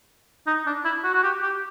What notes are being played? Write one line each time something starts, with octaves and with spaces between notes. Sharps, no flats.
D#4
D4
E4
F#4
F#4
G4
G4